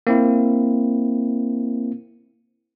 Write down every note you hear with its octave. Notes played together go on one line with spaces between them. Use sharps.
A#3 C4 E4